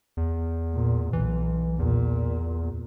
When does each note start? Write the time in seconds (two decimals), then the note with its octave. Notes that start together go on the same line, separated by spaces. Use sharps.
0.17 E2
0.74 A#2
1.13 B1 E3
1.79 E2 A#2